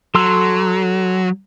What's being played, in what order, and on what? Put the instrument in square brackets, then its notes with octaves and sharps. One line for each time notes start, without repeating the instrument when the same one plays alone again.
[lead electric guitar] F#3 [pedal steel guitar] A4 C6 E6